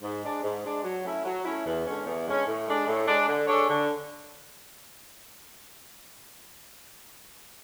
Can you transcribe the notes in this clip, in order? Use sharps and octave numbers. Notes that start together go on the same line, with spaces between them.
G#2
G#3 D4
G#2
G#3 D4
F#3
A3 C#4 E4
F#3
A3 C#4 E4
E2
D3 G#3 C#4
E2
D3 G#3 C#4
A2
G#3 D4
A2
G#3 D4
D3
G#3 D4 A4 C#5
D3